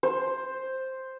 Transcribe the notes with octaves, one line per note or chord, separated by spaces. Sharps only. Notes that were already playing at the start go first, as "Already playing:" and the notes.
C5